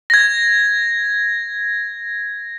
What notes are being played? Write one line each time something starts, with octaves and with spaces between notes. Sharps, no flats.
G#6 A#6